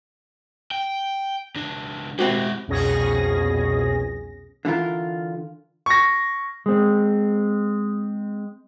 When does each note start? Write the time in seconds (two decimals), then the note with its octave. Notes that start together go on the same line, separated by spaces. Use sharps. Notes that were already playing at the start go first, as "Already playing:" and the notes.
0.71 G5
1.56 C#2 D4
2.19 G#3 C4 E4 F#4 G4
2.68 C2 F2 B2 C#4 G#4 A#6
4.65 D3 E3 E4 F4 A#4
5.86 C#6 A#6
6.66 G#3 C4